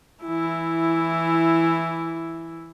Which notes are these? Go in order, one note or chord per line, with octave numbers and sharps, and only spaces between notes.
E3 E4